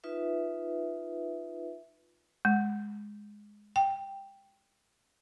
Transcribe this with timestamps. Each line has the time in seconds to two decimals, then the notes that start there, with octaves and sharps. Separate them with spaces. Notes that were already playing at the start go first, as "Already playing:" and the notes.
0.04 D#4 F4 B4 E5
2.45 G#3
3.76 G5